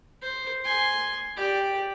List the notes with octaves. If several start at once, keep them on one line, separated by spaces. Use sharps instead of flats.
C5
G#5 C6
G4 D5